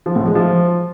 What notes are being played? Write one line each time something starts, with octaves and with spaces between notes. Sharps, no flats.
F3
A2
G#3
F3